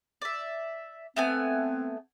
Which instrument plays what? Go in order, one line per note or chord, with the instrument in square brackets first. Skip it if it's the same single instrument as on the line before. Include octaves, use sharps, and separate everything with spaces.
[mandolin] D5 E5
[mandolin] A3 B3 G#5 [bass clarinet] C4